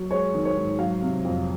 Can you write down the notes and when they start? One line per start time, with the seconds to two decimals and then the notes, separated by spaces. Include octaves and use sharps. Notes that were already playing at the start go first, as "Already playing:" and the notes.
Already playing: F#3
0.11 G#3 C#5
0.34 D#3
0.45 C#5
0.56 G#2
0.79 F#3 F5
1.01 C3
1.24 F2